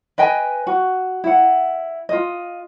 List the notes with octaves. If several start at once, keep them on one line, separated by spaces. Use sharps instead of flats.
B4 D#5 G5 G#5
F#4
E4 F#5
F4 D#5